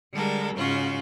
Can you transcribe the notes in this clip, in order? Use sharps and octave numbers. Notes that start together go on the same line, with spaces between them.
D3 G3 G#3 A4 A#4
G#2 C#3 C#4 F4 F#4